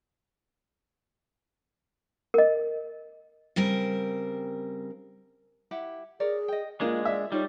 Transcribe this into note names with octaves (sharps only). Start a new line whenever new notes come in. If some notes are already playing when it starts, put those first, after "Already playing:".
A#4 D#5
C#3 G3 C4 A#4
E4 G4 F#5
G#4 A#4 C#5 D5
D#5 G5
G#3 A#3 D4 F4 C5 D#5
D5 E5
G3 D#4 F4 A#4 C#5